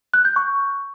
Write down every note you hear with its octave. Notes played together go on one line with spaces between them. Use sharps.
F#6
G6
C#6